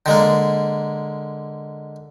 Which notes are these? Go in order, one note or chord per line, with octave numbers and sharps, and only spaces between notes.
D3 G#3 A#3